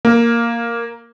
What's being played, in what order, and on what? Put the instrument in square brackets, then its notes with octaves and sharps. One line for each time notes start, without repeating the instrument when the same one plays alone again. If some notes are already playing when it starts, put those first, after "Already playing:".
[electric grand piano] A#3